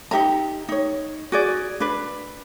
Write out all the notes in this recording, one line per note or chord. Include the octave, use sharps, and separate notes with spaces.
D#4 G4 E5 A#5
D#4 C#5
F#4 G#4 D5
D4 B4